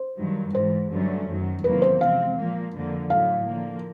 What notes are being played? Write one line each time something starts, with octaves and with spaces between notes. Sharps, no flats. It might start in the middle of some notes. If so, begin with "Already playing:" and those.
Already playing: C5
G2 D#3 F#3
G#2 E3 G#3 C5
G2 D3 F#3 A3 C#4
F#2 D#3 F#3
E2 C3 D#3 F#3 A#3 B4
C5
C3 F3 G#3 C4 F5
A#2 F3 A#3
F2 D3 F3 A#3
A2 F#3 A3 F5
D3 F3 A#3